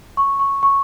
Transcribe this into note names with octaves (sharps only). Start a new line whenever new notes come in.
C#6
C#6
C#6